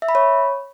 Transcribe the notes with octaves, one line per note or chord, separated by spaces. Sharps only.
E5
B5
C#5